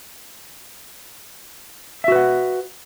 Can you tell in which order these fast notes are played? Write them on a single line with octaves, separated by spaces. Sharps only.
E5 F#4 B4 F#5